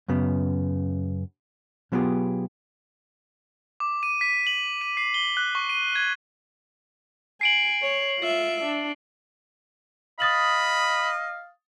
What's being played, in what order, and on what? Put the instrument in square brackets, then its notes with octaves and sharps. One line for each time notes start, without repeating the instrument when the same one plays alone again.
[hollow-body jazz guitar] F#2 C#3 B3
B2 F#3 B3 F4 G4 G#4
[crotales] D6
D#7
B6
F#7
D#7
C7
G7
F#6
C#6
D#7
G#6
[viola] G#5 [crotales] C7 D7 F#7
[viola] C#5
F4 E5
D4
[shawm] D#5 [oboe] F5 [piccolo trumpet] B5 [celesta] D#6 A6 F#7